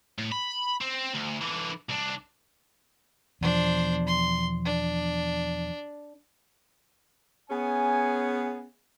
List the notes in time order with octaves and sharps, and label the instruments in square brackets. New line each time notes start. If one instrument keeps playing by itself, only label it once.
[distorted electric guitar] A2
B5
C4
D2
D3 E3
C2 D4
[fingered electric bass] E2 B2 F3 [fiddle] D4 C5
[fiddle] C6
D4
[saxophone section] B3 C#4 G#4 [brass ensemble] G#5